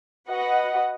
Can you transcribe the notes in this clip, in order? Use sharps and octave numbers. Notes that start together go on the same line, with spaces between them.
F#4 B4 D#5 F#5